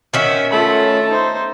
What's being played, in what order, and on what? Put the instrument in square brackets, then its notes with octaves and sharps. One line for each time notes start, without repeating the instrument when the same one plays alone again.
[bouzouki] D#3 C#4 F#4 [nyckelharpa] E5
[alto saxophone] A3 [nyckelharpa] F4 B5
[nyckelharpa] D#4 C5